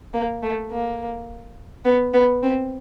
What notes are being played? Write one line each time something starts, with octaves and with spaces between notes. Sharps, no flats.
A#3
A3
A#3
B3
B3
C4